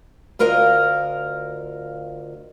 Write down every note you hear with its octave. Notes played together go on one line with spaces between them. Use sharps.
D2 F4 A#4 D#5 F5